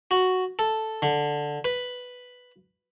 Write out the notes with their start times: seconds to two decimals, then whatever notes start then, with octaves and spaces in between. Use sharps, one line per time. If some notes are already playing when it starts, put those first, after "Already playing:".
0.11 F#4
0.59 A4
1.02 D3
1.65 B4